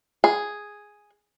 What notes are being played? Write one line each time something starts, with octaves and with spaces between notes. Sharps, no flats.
G#4